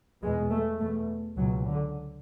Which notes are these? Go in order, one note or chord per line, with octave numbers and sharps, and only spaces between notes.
E2 B2 G#3
A3
E2 B2 A3
C#2 B2 F#3
D3